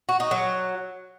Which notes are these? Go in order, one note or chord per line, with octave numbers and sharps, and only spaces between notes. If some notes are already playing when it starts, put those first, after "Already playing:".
F#4
D#4
F#3